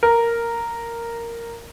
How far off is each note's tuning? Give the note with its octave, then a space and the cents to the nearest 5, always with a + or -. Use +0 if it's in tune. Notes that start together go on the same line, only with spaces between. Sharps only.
A#4 -5